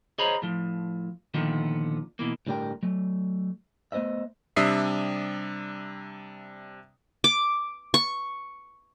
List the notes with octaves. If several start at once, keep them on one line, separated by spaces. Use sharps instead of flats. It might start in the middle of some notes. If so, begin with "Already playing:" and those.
G#4 C5 C#5 D#5 A#5 B5
A2 F3
A#2 D3 D#3 F3 B3
B2 E3 A#3
A2 D3 G3 A3 A#4 G5
F#3 A3
A3 B3 C5 D#5 E5
C3 G3 D4 E5 D#6 C7
D6
C#6